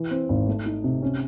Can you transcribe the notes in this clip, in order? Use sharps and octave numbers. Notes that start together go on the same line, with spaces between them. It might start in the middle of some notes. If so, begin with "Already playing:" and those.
Already playing: E3
C4
G#1
A3
D#4
C3
C#4